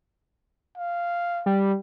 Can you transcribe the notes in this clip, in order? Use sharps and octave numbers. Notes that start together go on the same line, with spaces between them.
F5
G3